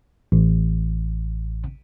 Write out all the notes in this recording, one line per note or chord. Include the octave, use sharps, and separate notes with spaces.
A1